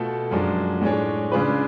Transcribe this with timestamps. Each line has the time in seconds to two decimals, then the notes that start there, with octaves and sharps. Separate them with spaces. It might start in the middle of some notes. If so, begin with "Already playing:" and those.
Already playing: B2 A3 F4 A4
0.31 F#2 F3 G#3 D4
0.81 A2 G#3 D4 G#4 C#5
1.32 C#3 G#3 D4 F4 B4